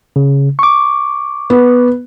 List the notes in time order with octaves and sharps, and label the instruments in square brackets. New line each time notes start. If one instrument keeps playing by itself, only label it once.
[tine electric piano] C#3
C#6 D6
[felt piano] B3